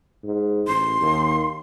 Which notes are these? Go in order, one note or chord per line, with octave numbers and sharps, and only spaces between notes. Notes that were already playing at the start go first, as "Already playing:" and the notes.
G#2
A1 C6
D#2